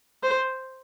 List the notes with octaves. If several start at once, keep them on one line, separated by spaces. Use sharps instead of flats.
C5